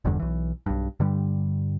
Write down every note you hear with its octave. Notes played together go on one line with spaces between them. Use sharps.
F1 E2 G2 D3
B1 E3
B1 G2
G2 D3 G3